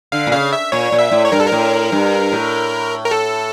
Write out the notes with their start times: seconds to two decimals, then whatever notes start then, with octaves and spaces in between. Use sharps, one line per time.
0.12 D3 F5
0.27 A#2
0.32 C#3 F5
0.53 E5
0.72 A#2 C#5
0.92 A#2
0.99 E5
1.11 A2
1.25 C#5
1.32 G2 A#4
1.40 A4
1.46 A#4
1.52 A2
1.92 G2
2.32 A2
3.05 A#4
3.11 A4